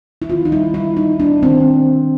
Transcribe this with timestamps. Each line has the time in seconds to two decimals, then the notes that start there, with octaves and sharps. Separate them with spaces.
0.22 E4
0.30 D#3 F4
0.45 D#4
0.52 G3 E4
0.74 G3 E4
0.97 G3 D#4
1.20 A#3 D4
1.43 D#3 C4